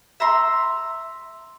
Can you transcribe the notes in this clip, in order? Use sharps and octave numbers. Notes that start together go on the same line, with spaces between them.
E5 A#5 C6